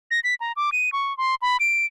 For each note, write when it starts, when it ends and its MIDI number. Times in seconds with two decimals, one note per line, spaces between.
0.11 0.20 94
0.24 0.35 95
0.40 0.52 82
0.57 0.70 86
0.72 0.92 99
0.92 1.16 85
1.18 1.35 84
1.42 1.57 83
1.60 1.86 98